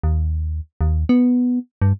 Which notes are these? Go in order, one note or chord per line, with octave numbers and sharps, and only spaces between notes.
D#2
D#2
B3
G2